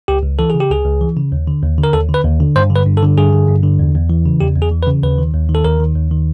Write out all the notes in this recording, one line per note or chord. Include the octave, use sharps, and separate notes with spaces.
C#2 G4
C#2
E3 A4
C#3 G#4
G4
C#2 G#4
C#2
E3
C#3
D#2
D3
D#2
D3
A#4
D#2 A4
D3
B4
D#2
D3
G2 C5
D3
B4
G2
A4
D3
G2 G#4
D3
G2
D3
E2
E2
E3
C#3
E2 G4
E2
G#4
E3
B4
C#3
D#2 B4
D#3
D#2
D#3
A4
D#2 A#4
D#3
D#2
D#3